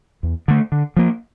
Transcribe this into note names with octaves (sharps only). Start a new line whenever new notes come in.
E2
D3 A3
D3
F3 A#3